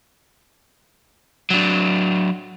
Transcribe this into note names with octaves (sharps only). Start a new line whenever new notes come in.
F#3 D4